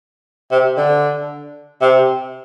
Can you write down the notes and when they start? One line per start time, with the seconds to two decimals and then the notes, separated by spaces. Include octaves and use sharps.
0.51 C3
0.77 D3
1.81 C3